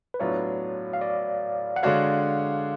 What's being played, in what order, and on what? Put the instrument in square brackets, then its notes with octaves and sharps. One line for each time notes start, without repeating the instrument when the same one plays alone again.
[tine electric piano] B4
[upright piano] A2 F#3 B3 D4 F4 [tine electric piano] C#5
[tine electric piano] F5
D5
F#5
[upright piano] D3 G#3 D4 F#4 C#5 [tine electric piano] F5